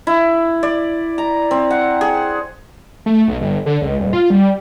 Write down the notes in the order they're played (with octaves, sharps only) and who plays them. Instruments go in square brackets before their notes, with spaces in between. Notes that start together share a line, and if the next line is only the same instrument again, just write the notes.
[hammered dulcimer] E4
D5
A#5
C4
F#5
G#4
[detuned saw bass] A3
B1
G1
D3
C#2
D#1
F4
G3